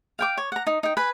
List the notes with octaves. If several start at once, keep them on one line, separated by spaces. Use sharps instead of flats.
F5 G5 D6
C#5
F#5 A#5
D#4
D#4 G5
B4 G#5